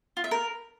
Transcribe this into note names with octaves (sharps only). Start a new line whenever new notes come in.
F4
E5
A#4